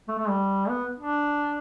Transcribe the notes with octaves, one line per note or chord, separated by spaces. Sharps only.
A3
A3
G3
B3
D4